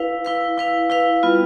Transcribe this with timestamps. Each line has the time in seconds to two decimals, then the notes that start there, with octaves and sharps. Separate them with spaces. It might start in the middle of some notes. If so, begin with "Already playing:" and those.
Already playing: E4 B4 F5
0.25 E4 B4 F5
0.58 E4 B4 F5
0.90 E4 B4 F5
1.23 G3 B3 F4